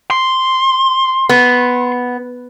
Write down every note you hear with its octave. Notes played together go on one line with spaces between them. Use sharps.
C6
B3